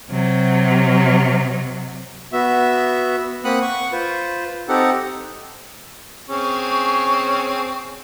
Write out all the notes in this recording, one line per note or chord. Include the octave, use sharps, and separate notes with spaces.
C3 F#3
B3 F#4 E5
A#3 C4 F#5 B5 D#6 F#6
F#5 C#6
F4 B4 C5
C4 D#4 G4 A4 F#5
C4 C#4 G#4 C#6